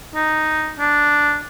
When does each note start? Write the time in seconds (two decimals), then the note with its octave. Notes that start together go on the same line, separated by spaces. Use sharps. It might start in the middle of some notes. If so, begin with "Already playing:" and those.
0.15 D#4
0.80 D4